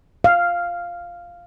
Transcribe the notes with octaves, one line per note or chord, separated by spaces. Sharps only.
F5